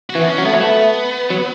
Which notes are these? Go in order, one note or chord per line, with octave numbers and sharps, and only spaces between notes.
F#4
E3
B3
C#4
F#3
A3 B3
F#3 C#4
A3 B3
F#3